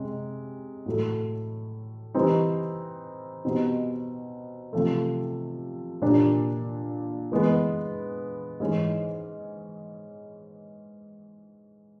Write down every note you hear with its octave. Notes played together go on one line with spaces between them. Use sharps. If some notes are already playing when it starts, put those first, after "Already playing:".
Already playing: C3 G#3 C#4
A2 F#3 A3
E3 G3 C4 D#4
B2 G3 C4 D#4
C3 F3 A3
A#2 G3 A#3 D4
E3 G#3 B3
G#2 E3 G#3 C#4